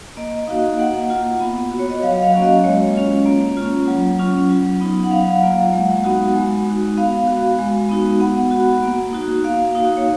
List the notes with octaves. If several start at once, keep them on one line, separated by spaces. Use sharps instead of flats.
A#3 D#5
D#4 F#4 F5
A#3 F#5
F4
B3
F#4
C#5
D#5
F#3 F5
F5
A#3 C#4 F#4
D#5
G#3 C#5
C#4 F4
A#3
C#4 F4
F#3
C#4 F4
F#3
B3 D#4
F#5
F#3 F5
A#3 F4 F5
G#3 F#5
B3 D#4 F#4
G#3
D#4 F#4
B3 F5
F#4
G#3
B3 D#4 F#4
B3 F#5
F#4
A#3
D#4 F#4
A#3 F5
D#4 F#4
C#5